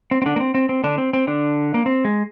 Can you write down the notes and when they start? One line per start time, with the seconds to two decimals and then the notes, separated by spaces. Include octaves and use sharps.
0.11 C4
0.22 C4
0.26 D3 D4
0.36 A#3
0.40 C4
0.55 C4
0.69 C4
0.84 D3 D4
0.98 C4
1.13 C4
1.27 D3 D4
1.74 A#3
1.86 C4
2.05 G#3